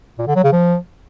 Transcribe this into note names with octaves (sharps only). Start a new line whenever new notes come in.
A#2
D3
F#3
C#3
F3